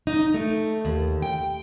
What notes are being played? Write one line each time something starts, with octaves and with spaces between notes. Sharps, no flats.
D#4
A3
D#2
G5